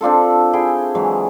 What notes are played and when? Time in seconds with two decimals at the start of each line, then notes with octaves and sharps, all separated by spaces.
0.01 C4 D4 F4 A4
0.53 E4 G#4 G5
0.95 E3 F#3 G#3